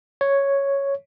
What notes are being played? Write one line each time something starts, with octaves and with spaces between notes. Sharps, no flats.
C#5